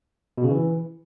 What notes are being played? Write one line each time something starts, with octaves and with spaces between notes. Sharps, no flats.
B2
C#3
E3